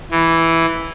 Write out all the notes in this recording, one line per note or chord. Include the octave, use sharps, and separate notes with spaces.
E3